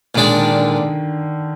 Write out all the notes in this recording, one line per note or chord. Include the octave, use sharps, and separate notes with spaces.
A#2 D#3 G#3 D4
D3
D#3
D3